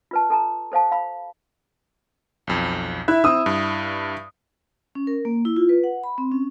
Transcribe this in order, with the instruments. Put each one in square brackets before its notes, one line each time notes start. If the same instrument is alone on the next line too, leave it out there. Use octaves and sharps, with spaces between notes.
[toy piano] F4 B4 A5
A4 A5 A#5
A4 C5 F5 A5
F5 B5
[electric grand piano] B1 F2
[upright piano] E4 F#6 [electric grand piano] E5
[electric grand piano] C4 E6 [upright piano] E4 D#6
[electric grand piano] G2
[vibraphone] C#4
A#4
A#3
E4
F4
B4
F#5
B5
C4
C#4